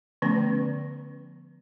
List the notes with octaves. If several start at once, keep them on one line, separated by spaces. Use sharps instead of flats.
D3 F3 A3 B3 C#4 B4